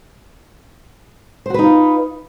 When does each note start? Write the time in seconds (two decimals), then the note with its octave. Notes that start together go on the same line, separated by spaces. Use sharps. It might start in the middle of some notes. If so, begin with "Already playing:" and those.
1.46 C5
1.50 F#4
1.54 B4
1.59 D#4
1.63 F4